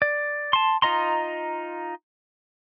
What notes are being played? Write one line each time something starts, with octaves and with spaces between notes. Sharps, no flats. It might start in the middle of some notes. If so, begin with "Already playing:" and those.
D5
A5 C6
D#4 F4 D#5 A#5 C6